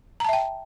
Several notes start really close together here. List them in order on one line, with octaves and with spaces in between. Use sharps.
A#5 A5 E5 G5